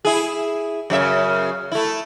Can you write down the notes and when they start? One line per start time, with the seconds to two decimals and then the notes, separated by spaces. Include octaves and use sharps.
0.05 E4 G#4
0.90 F#2 C#3 E5
1.72 A3 E4